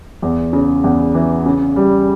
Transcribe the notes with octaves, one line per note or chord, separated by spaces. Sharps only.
E2
C#3
E2
E3
C#3
G3